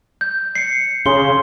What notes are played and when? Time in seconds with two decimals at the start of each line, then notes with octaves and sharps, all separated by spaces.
0.21 G6
0.55 C7 C#7
1.06 C#3 C6 G7